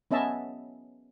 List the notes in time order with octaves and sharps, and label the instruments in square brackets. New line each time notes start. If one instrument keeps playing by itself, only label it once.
[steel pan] B3 C#4 D#5 E5 A5